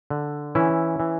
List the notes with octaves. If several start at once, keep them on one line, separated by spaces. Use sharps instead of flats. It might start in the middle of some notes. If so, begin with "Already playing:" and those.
D3
E3 C#4 E4
E3